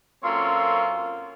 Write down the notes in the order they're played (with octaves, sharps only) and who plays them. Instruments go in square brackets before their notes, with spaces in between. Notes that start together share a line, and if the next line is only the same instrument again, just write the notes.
[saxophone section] F#2 A#3 C4 F4 A4 C#5